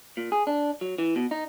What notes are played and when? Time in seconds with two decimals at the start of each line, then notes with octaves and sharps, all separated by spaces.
0.17 A#2
0.32 G#4
0.47 D4
0.81 F#3
0.98 E3
1.16 B2
1.31 D#4